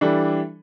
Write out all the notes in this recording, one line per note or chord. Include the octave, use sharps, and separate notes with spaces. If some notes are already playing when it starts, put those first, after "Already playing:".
E3 G3 D4 A4